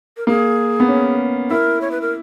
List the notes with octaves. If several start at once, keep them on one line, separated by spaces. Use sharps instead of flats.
A#4
A#3 G#4
B3
C#4
E4 A#4
C#5
B4
A#4